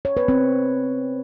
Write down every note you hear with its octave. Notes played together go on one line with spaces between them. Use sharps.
C#5
B4
C4